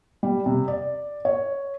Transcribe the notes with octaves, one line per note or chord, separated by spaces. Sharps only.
G3
C3
D5
C#5